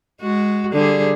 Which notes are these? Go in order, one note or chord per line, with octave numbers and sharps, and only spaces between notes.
G#3 F#4
D3 G3 G#4